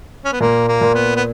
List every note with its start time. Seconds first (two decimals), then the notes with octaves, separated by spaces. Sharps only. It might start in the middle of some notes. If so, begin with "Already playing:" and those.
0.25 C#4
0.32 B3
0.40 A#2 A#3
0.68 A#3
0.81 A#2
0.95 B3
1.16 B3